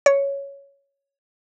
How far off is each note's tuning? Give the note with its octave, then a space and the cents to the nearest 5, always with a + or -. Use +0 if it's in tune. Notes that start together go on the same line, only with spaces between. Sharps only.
C#5 +5